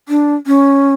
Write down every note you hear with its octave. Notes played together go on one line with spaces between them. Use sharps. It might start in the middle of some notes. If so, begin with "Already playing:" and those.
D4
C#4